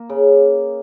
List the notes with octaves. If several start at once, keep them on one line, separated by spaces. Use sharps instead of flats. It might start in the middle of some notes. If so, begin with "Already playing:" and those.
Already playing: A#3
C#3